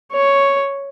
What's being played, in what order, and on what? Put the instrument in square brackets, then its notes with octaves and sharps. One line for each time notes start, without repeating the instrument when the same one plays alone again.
[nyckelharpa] C#5